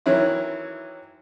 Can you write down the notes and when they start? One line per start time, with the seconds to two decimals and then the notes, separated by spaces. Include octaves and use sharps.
0.06 D#3 E3 F#3 C#4 E4